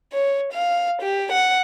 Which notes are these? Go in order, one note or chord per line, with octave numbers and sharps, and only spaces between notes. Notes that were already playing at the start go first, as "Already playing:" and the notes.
C#5
F5
G4
F#5